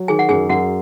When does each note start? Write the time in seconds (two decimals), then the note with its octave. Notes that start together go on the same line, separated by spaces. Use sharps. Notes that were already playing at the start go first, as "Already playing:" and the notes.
Already playing: F#3
0.08 D#3 G#4 G#5
0.19 F#5
0.29 F#2 G#4 G#5
0.49 F#2 F#4 F#5